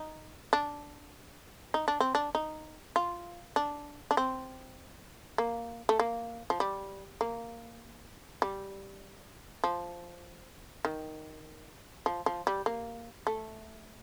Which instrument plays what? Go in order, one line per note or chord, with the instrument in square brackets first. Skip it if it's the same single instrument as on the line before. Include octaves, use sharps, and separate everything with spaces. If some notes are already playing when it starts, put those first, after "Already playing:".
Already playing: [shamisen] D#4
D4
D#4
D4
C4
D4
D#4
F4
D4
D4
C4
A#3
A3
A#3
F3
G3
A#3
G3
F3
D#3
F3
F3
G3
A#3
A3